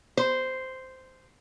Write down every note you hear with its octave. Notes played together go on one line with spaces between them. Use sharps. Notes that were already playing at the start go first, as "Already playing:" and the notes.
C5